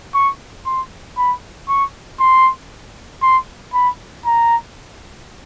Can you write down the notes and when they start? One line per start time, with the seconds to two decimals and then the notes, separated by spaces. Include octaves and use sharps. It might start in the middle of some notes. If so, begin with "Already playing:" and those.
0.14 C#6
0.66 C6
1.17 B5
1.69 C#6
2.20 C6
3.22 C6
3.74 B5
4.26 A#5